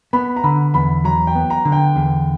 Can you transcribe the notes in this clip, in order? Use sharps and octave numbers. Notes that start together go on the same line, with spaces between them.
B3 B5
A#5
D3 B5
E2 B5
F#3 A#5
G5
B3
A#5
D3
G5
E2